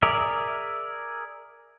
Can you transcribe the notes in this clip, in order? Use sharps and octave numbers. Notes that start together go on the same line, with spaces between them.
G#4 A#4 D5 E5